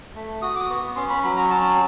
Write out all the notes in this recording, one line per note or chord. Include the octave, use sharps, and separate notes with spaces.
A3
F#4 D#6
D6
D#6
B3
C#4 C6
B5
F#3 B5
A#5
C#4 A5